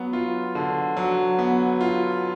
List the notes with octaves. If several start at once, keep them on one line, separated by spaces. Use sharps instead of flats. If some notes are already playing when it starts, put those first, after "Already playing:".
Already playing: F#3 B3
F4
D3
F#3
B3
F4